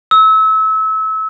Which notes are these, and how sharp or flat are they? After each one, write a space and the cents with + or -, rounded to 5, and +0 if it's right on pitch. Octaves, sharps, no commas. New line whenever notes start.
E6 -30